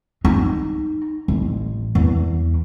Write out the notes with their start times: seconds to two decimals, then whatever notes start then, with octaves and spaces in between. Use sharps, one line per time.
0.25 D#4
1.28 A1
1.95 E2